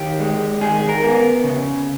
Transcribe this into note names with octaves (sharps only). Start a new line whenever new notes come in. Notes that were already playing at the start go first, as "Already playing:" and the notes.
Already playing: D#3 G4
G#3
D#3 G#4
A#4
B3
C#3